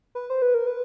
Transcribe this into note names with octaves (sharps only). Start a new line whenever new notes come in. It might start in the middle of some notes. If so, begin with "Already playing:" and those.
B4
C5
B4
A#4
B4